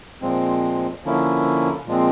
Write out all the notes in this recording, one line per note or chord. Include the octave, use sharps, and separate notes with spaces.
A#2 F3 G#3 C4
D3 F3 A#3 C#4 E4
A#2 F3 G#3 C4